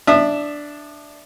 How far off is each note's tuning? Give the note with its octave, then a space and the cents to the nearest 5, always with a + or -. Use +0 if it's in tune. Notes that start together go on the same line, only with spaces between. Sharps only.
D4 +0 E5 +0 D#6 -40